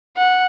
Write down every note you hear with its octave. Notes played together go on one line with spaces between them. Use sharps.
F#5